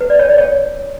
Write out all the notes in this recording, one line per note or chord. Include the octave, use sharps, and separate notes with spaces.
B4
D5
C#5
D5
C#5